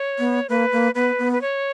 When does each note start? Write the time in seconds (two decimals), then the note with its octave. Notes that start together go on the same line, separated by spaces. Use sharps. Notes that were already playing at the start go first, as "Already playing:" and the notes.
Already playing: C#5
0.19 B3
0.49 A#3 B4
0.72 A#3
0.95 B3 B4
1.19 B3
1.33 B4
1.41 C#5